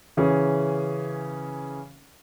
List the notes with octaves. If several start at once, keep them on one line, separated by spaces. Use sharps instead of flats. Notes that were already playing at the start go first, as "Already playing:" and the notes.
C#3 E3 C#4 G#4